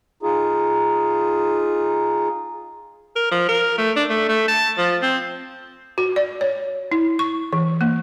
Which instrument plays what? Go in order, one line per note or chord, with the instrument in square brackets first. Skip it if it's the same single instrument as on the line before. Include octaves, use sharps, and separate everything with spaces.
[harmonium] D#4 F4 G#4
[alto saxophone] A#4
F3
A#4
A3
D4
A3
A3
A5
F3
C4
[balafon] F#4
D5
C#5
E4
C#6
E3
A#3